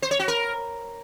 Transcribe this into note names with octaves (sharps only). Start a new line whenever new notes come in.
C5
C#5
F#4
A#4